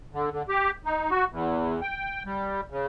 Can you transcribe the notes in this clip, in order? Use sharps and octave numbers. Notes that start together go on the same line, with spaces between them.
D3
D3
G4
D#4
F#4
E2
G5
G3
C#3